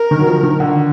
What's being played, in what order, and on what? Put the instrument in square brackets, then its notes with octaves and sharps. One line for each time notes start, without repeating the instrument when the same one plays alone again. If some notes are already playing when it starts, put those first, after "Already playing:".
Already playing: [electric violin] A#4
[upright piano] D#3
F#3
F3
D#3
D3